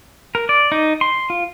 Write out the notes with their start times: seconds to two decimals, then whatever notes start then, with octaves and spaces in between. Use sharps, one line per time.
0.35 A#4
0.49 D5
0.72 D#4
1.01 C6
1.30 F4